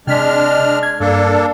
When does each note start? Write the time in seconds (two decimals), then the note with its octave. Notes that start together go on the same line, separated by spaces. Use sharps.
0.07 C3 G#3 D4 F6 B6
0.83 G#6
1.00 G2 A#3 D4 A4